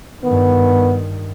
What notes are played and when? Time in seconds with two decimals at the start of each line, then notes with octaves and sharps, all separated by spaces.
0.24 G2 D#3 B3